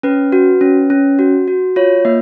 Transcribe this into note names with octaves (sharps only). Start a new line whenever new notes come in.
C#4 B4
F#4
C#4
C#4
F#4
F#4
F4 C#5
A#3 D#5